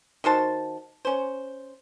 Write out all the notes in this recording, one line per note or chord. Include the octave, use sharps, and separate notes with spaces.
D#3 F#4 C5 A5
C#4 C5